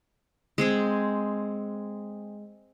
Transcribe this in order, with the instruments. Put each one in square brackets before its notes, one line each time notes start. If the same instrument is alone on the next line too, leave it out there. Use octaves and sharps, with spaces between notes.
[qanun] G#3 C4 G#4